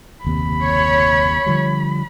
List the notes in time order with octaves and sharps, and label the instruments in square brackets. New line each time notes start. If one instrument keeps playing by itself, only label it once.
[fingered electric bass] F#1 D#2 C3 [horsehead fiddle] B5
[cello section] C#5
[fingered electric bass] D3 F3 G3